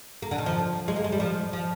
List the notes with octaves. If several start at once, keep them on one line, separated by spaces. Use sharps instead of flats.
A#3
D3
D#3
F3
G#3
A#3
G#3
G3
F3
F3